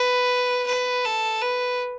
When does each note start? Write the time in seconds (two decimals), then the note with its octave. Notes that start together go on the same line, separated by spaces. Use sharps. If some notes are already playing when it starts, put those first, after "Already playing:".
Already playing: B4
0.67 B4
1.05 A4
1.42 B4